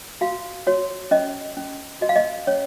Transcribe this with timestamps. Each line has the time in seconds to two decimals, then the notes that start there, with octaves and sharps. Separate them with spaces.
0.21 F#4 F5
0.67 F#4 C#5
1.11 C#4 D#5
1.57 C#4
2.01 F#4 D#5
2.09 F5
2.16 D#5
2.47 C#4 C#5